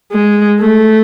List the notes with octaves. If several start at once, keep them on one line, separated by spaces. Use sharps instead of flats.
G#3
A3